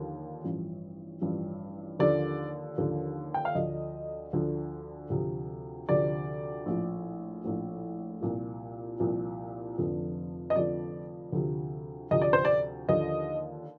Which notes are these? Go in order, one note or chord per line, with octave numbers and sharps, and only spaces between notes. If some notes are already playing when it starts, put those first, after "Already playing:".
Already playing: D#2 D3 F3
A1 G2 F3
A1 G2 F3
D#2 D3 F3 D5
D#2 D3 F3
G5
F5
D2 D3 F3 D#5
D2 D3 F3
D2 C3 F3
D2 C3 F3 D5
A#1 A2 F3
A#1 A2 F3
C2 A#2 F3
C2 A#2 F3
F1 F2 D3 F3
D#5
F1 F2 D3 F3 D5
D2 C3 F3
D2 C3 F3 D#5
D5
C5
D5
D#2 D3 F3 D#5